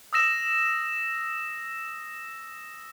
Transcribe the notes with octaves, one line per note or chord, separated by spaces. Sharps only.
D#6 E6 A#6 E7